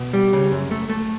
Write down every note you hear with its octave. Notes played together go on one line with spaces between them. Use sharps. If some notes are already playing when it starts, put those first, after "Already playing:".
Already playing: B2
G3
C#3
F#2
A3
A3